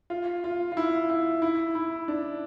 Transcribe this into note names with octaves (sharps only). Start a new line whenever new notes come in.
F4
F4
F4
E4
E4
E4
E4
D4